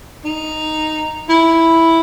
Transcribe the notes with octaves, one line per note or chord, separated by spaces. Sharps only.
D#4
E4